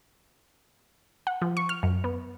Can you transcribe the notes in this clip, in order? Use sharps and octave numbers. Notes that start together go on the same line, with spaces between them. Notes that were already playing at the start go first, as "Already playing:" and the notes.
F#5
F3
C#6
F6
F#2
B3